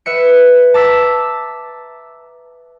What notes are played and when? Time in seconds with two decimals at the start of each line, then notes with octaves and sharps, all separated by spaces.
0.06 B4 E5 C#7
0.74 A5 A#5 D6 E6 A6 B6